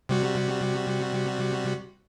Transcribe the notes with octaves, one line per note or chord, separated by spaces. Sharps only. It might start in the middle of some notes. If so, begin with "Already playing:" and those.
C3 G3 F#4